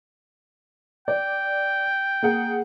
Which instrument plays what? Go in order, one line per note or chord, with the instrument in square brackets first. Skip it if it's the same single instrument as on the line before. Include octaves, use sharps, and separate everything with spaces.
[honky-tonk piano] D5 [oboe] G5
[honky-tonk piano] A#3 G#4 F#5